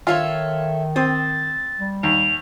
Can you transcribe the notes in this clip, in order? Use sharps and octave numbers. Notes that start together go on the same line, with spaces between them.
D#3 F4 A4 C#5 E5
C4 D#6 A6
G3
D#2 F7